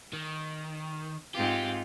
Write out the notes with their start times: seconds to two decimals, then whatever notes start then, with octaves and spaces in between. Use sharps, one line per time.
0.13 D#3
1.34 G#2 C4 F4 G4